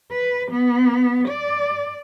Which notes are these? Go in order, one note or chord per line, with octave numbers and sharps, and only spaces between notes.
B4
B3
D5